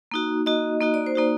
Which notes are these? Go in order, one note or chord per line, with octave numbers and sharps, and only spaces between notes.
A#3 D#4 F#4
A#3 D#4 F#4 D#5
A#3 D#4 F#4 D#5
D5
C5
A#3 D#4 F#4 D5